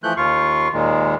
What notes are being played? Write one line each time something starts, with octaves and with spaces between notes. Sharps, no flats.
E3 F3 A3 F#6 G6
D#2 F4 F5 C#6
D#2 A#2 D#3 G#3